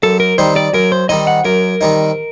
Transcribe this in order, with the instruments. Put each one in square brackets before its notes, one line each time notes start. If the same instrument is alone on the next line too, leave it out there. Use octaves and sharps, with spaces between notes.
[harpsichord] F#2 [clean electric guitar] A4
[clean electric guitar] A#4
[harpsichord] D#3 G3 C4 D#4 [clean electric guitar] C5
[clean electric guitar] D5
[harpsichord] F#2 [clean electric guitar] A#4
[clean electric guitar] C5
[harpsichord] D#3 G3 C4 D#4 [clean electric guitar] D#5
[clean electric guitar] F#5
[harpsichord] F#2 [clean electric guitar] A#4
[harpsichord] D#3 G3 C4 D#4